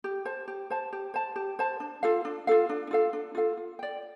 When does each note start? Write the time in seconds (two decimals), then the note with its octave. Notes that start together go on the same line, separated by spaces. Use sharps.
0.04 G4
0.25 C5 A5
0.48 G4
0.70 C5 A5
0.93 G4
1.14 C5 A5
1.36 G4
1.59 C5 A5
1.80 D4
2.03 F4 A4 F5
2.25 D4
2.47 F4 A4 F5
2.69 D4
2.91 F4 A4 F5
3.13 D4
3.35 F4 A4 F5
3.57 F4
3.79 D5 G5